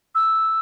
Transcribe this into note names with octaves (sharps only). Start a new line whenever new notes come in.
E6